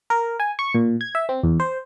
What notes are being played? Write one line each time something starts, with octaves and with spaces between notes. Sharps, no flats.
A#4
G#5
C#6
A#2
G#6
E5
C4
E2
C5